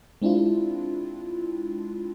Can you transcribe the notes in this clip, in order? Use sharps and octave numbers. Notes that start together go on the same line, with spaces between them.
G#3 C4 D4 E4 F4